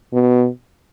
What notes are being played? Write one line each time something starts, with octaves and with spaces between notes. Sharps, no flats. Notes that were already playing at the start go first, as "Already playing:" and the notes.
B2